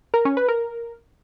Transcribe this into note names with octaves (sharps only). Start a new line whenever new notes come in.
A#4
C#4
B4
A#4